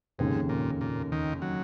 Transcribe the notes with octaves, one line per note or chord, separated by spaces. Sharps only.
F1 D#2 G#2 C#3
A#2
A#2
D#2 D#3
F#3